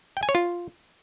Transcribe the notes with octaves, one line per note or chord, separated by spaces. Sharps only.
G5
G#5
C#5
F4